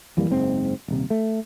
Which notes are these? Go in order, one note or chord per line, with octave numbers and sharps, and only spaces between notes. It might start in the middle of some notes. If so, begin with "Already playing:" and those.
F2 E3 G3 A#3
F#1 G#2 C4
D#1 C3
A3